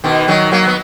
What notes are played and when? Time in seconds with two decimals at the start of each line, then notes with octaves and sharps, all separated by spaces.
0.04 B2 D#3
0.28 D#3 F#3
0.52 F#3 A#3
0.67 B3